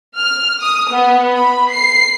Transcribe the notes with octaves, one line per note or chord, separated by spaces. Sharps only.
F6
D#6
B3
B5
C7